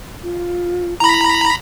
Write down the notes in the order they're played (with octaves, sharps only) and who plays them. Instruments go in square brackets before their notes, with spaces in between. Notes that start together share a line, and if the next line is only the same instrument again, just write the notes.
[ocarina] F4
[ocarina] E4 [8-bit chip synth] A#5 B5